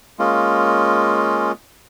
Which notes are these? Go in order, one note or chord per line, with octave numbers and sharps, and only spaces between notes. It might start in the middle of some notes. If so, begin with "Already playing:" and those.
G#3 A#3 C#4 F4